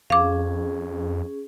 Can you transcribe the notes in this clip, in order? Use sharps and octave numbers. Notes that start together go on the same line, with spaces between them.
F2 C#4 G#4 F5 D6